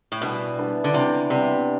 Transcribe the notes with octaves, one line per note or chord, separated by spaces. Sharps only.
A2
B2 E3 G3 B3 D4
E3 G3 B3 D4
D3
C3 E3 G3 B3 D4
C3 E3 G3 B3 D4